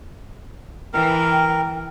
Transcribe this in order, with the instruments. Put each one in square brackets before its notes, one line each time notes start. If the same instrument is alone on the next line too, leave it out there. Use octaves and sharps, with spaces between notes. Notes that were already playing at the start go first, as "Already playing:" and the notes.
[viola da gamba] E3 [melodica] A#4 [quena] G5